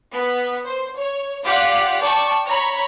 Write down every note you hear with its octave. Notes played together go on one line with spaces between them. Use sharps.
B3
C5
C#5
F4 G4 D5 F5 F#5
D5 G5 A5 C#6
C#5 A#5 B5 C#6